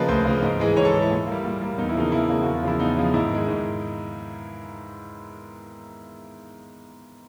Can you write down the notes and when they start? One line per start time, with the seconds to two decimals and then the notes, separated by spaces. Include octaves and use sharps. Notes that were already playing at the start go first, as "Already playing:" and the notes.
Already playing: C#3 F3 A#3 B4 D#5
0.09 D2 C5
0.25 C#3 F3 A#3
0.42 G#2
0.60 E3 G#3
0.76 G#2 C#5
0.85 A4
0.94 E3 G#3
1.02 E4
1.11 A#2
1.27 G3 A#3
1.44 A#2
1.61 G3 A#3
1.78 E2 D#4
1.89 E4
1.95 C#3 F3 A#3 D#4
2.12 E2 E4
2.29 C#3 F3 A#3
2.42 E2 F#4
2.54 F4
2.63 C#3 F3 E4
2.79 E2 D#4
2.97 C#3 F3
3.14 G#2 E4
3.30 D#3 G#3
3.48 G#2